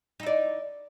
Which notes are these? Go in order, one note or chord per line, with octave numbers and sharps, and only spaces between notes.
D#4 E4 D5